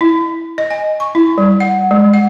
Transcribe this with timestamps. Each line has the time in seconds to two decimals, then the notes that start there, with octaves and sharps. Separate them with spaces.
0.01 E4
0.58 D#5
0.70 G#5
1.00 C#6
1.15 E4
1.38 G3
1.60 F#5
1.91 G#3
2.14 F#5